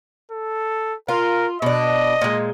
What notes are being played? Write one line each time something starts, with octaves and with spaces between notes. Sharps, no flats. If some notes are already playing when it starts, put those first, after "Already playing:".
A4
F4 A#4
B2 D4 D#5
A#2 G#3